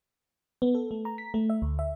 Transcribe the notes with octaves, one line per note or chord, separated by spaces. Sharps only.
B3
A4
A3
A#5
B6
A3
E5
D2
E5